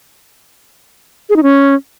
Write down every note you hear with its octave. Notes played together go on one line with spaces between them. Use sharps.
G#4
D#4
C#4